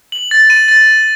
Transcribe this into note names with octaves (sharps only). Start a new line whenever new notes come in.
F#7
A6
D#7
A6
D#7